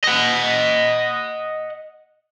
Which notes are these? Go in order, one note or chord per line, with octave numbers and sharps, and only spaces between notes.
D#5 F#5